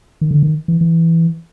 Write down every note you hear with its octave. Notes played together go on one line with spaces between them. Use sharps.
D#3
D3
D#3
E3
E3